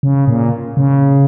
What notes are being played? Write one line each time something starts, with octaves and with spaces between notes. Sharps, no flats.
C#3
A#2
C#3